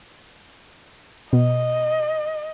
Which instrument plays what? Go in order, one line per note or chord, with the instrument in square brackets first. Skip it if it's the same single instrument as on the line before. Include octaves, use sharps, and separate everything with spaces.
[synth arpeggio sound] B2 [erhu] D#5